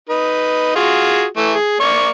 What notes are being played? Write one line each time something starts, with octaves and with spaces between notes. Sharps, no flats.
D#4 B4
F4 F#4 G#4
E3 A3
G#4
A#3 D5 C#6